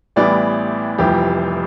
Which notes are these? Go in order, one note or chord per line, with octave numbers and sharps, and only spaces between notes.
A1 A2 E3 G3 B3 D5
F1 F2 E3 G3 G4